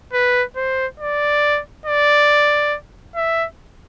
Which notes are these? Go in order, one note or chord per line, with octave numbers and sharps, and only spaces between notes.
B4
C5
D5
D5
E5